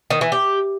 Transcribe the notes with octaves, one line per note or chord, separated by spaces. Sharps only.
D#3
E3
G4